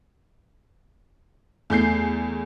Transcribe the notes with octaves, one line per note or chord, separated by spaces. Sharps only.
E2 A3 G6 C7